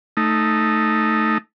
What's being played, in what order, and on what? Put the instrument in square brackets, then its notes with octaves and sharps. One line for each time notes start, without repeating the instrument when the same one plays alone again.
[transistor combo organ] A3 D#4